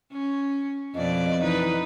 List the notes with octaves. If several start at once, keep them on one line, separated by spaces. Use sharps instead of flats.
C#4
F2 B2 D5 D#5
E3 D#4 B4